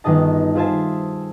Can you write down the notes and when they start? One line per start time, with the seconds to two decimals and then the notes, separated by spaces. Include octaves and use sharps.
0.04 G1 D#3 G#4 D#5 A5
0.55 F4 G#4 C5 E5 G#5 A5